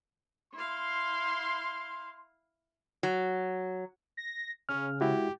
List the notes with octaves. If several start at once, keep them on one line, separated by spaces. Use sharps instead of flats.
E4 F5 C6
F#3
A#6
C#3 C#4 F6
G#3 E4 F#4 G4